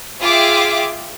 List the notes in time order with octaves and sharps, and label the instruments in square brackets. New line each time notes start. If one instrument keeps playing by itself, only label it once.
[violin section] F4 G#4 E5 G5 D6